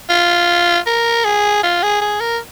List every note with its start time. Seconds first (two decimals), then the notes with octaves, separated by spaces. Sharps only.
0.10 F4
0.87 A#4
1.25 G#4
1.63 F4
1.83 G#4
2.01 G#4
2.21 A#4